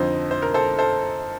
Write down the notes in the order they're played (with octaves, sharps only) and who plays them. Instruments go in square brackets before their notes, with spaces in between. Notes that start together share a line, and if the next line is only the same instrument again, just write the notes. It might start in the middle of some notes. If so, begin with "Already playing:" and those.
Already playing: [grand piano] F2 D3 F3 C4 D#4 C5 D#5
C5
A#4
A4 C5
A4 C5